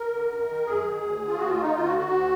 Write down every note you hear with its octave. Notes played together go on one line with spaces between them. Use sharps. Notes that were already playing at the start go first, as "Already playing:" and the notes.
Already playing: A#4
D3
F#2
D#3
F#2 G#4
D#3
D2
D3
F4
D2 F#4
F4
D3
D#4
D2 F4
F#4
D3
F#4
D2